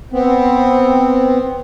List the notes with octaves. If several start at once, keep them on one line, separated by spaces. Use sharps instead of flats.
B3 C4